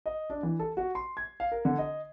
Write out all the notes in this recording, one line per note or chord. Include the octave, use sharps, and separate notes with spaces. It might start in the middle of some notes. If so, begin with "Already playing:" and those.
D#5
D4
E3
A4
F#4
C6
G#6
F5
A#4
D3
D#5